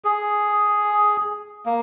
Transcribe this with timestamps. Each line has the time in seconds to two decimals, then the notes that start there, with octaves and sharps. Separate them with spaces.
0.04 G#4
1.66 A#3